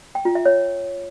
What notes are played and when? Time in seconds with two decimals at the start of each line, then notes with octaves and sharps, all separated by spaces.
0.15 G5
0.25 F4
0.35 E5
0.45 C#5